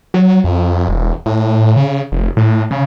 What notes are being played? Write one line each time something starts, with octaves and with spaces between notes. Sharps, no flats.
F#3
F2
E1
A2
C#3
F1
A2
C#3